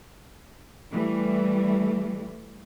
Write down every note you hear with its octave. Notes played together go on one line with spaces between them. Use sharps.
E3 G3 A3